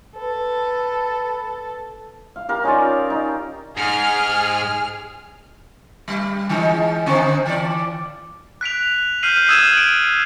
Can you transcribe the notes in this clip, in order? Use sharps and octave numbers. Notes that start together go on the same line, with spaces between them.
A4 B4
F5
G4 A#4 F5
C#4 D#4 F4 D5
D#4
G#2 G#4 F6
G3
E3 G#3 D#4
D3 C4 D#4
E3 D5
F#6 B6 D7 F7
F6 G6 B6 C7 D#7 F#7
D#6 E6 G#6 D#7 E7
D7 E7 F#7